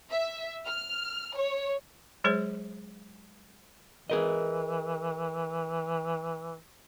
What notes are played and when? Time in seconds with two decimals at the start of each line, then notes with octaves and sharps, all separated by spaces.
0.11 E5
0.68 F6
1.37 C#5
2.24 F#3 G#3 G#4 C5 C#5
4.10 E3 G#4 A#4 D#5